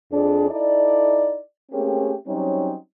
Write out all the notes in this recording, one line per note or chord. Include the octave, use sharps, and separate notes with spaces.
F2 D4 G#4
D#4 E4 A4 D5
A3 A#3 C4 C#4 G4 G#4
F#3 G3 C4 C#4 D#4